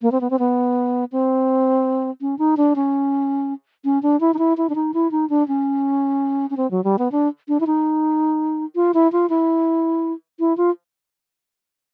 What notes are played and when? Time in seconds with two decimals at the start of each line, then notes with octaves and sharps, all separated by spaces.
0.02 A#3
0.12 C4
0.21 B3
0.30 C4
0.39 B3
1.12 C4
2.21 C#4
2.39 D#4
2.57 D4
2.76 C#4
3.85 C#4
4.03 D4
4.20 E4
4.34 D#4
4.39 E4
4.57 E4
4.69 D4
4.75 D#4
4.94 E4
5.11 D#4
5.30 D4
5.48 C#4
6.50 C#4
6.57 C4
6.71 F#3
6.84 G3
6.99 B3
7.12 D4
7.48 D4
7.60 E4
7.67 D#4
8.75 F4
8.94 E4
9.12 F4
9.30 E4
10.40 E4
10.57 F4